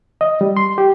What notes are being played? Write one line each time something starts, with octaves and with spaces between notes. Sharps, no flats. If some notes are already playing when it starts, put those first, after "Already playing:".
D#5
G3
C6
G4